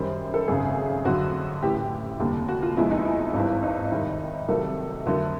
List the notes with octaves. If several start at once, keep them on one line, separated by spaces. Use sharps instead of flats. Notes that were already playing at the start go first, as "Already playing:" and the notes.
Already playing: F#2 D#3 G3 C5
A4
G#1 F#2 C#3 G#4
F2 D3 F#3 F#4
A1 A2 E3 G4
G4
F1 D#2 D3 G3
F#4
F4
E2 C3 F3 G#3 E4
D#4
E4
G#1 G2 E3
D#4
F2 C3 D#3 G3
C2 C3 D#3 F#3 A3 A4
F2 D3 F#3 A3 A#4